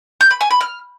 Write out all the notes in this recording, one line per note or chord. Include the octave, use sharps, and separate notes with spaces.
G6
B5
G#5
B5
F6